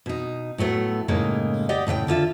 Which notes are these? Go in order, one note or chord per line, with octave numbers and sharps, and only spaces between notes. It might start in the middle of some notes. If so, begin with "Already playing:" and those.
B2 D#4
A2 F#3 A3 B3
F#2 A2 C#3 G#3 A#3 D#4
G4 D5 D#5 F#5
A2 C#3 F5 G5
D#2 D3 F4 E5